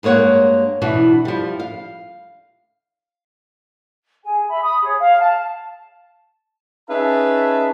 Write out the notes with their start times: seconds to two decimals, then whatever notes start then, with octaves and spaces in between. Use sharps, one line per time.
0.03 G2 G#3 A#3 C#5 F#5
0.82 B2 E3 D4 F#4
1.25 F3 G3
1.60 F5
4.24 G#4 G#5
4.48 E5 B5
4.62 B5 D#6
4.82 G#4 C#5
4.98 F5
5.20 A5
6.90 C#4 D#4 G#4 B4 E5 A5